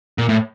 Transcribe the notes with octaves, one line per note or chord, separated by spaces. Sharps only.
A#2
A2